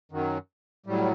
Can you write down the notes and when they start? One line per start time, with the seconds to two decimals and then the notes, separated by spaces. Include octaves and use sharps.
0.12 F#2 D#3 F#3
0.86 A2 F#3 G3